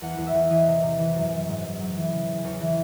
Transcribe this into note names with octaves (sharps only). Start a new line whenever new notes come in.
E2 F#5
E2
E5
E2
E3 D#5
C3
C3
E3
F#2
F#2
G#2
F#3
F#3
E3
C#3
C#3
E2 C#5
E3